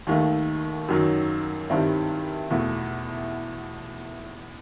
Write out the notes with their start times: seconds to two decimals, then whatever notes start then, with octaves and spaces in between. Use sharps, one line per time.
0.07 D#2 D#3 A3
0.88 F#2 D#3 F#3
1.70 G2 D#3 G3 C4 E4
2.50 E2 B2 A3 E4